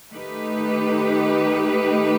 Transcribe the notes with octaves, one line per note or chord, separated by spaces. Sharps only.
D#3 A3 D#4 G4 B4